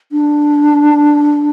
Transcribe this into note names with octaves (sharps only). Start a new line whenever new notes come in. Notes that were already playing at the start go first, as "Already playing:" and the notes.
D4